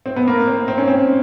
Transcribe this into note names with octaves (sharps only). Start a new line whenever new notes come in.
C4
B3
A#3
C4
C4
C#4
C4